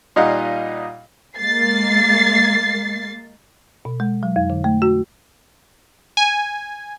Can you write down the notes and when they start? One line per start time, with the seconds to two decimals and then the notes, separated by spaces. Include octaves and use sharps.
0.16 A#2 G3 D#4 D#5 F5 F#5
1.38 G#3 A#3 A6 C7
3.85 B2
4.00 G#3
4.23 F#3
4.36 F2
4.50 D3
4.64 A3
4.82 F#4
6.17 G#5